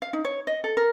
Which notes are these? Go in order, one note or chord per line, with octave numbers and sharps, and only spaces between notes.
F5
D#4
C#5
D#5
A4
A#4